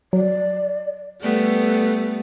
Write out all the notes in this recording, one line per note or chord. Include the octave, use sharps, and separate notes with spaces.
F#3 D5
G3 A3 B3 A4